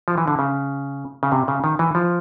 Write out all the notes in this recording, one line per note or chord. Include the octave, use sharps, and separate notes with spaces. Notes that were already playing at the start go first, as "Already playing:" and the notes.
F3
E3
D3
C#3
C#3
C3
C#3
D#3
E3
F3